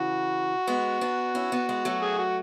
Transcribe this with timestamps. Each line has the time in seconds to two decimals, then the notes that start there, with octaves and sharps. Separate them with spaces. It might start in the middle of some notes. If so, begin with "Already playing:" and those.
Already playing: C#3 E3 F#4
0.67 G#3 B3
1.01 B3 D4
1.35 C#4 E4
1.52 B3 D4
1.69 G#3 B3
1.85 F#3 A3
2.02 G#4
2.19 F#4